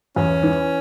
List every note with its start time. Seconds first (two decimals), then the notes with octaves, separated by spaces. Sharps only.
0.16 E2 C#4
0.43 E3